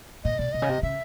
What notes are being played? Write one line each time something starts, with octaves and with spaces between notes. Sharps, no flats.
A#2 D#5
B2 D5
B2 D#5
C#3
C3
C#3 E5